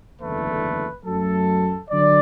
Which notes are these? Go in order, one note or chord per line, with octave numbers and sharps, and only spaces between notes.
F#1 E2 D3 A3 B4
F#2 F#3 A3 A4
D3 F#3 D5